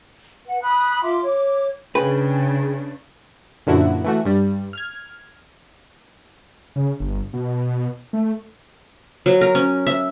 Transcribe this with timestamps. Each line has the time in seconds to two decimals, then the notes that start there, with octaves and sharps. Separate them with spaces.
0.45 B4 F#5
0.62 B5 D#6 F#6
1.02 F4 E5 C6 D6
1.24 C#5 D6
1.95 C#3 D4 G#4 B4 G5
3.67 F#2 A#2 D3 F3 E4 F#4
4.04 E3 A3 F#4
4.25 G2 G3
4.73 F6 G#6
6.76 C#3
7.00 G1
7.33 B2
8.13 A3
9.26 F#3
9.41 A#4
9.55 C#4
9.87 E5